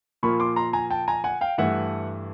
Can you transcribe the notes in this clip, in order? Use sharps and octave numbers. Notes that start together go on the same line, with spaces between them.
A#2 F3 A#3 B5 C#6
C6 D6
A#5 C6
G#5 A#5
G5 A5
G#5 A#5
F#5 G#5
F5 G5
G2 E3 A3 E5 F#5